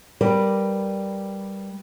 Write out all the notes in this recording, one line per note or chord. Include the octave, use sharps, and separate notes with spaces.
G3 A#4 B4 D5